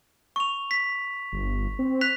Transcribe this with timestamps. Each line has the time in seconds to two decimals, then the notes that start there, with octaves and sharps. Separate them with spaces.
0.36 C#6 F7
0.71 B6
1.33 G1
1.79 C4
2.01 F#6 B6 F7